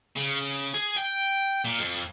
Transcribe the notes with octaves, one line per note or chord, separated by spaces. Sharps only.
C#3
G#4
G5
A#2
F2